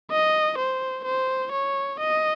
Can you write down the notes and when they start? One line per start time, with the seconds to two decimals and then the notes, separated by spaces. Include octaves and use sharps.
0.11 D#5
0.58 C5
1.05 C5
1.52 C#5
2.00 D#5